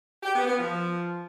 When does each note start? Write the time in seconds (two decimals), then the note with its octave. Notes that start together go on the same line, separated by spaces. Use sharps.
0.22 G4
0.34 B3
0.46 B3
0.58 F3